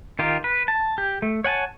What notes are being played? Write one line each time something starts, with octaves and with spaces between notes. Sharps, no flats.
D#3 F4 G4 A#4
B4
A5
G4
A3
C#5 F#5 G#5 A5